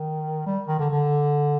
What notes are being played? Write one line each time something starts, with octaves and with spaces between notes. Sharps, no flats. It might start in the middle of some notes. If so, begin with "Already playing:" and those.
Already playing: D#3
G3
D#3
D3
D3